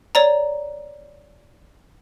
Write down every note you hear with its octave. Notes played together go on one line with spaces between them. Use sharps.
C#5 D5 A#5